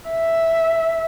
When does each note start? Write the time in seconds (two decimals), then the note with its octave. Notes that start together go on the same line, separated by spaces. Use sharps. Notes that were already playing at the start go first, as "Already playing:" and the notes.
0.11 E5